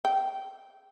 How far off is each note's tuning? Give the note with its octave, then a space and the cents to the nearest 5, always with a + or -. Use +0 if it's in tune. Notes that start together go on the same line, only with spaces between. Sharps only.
G5 -20